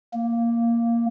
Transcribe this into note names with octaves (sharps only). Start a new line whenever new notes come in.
A#3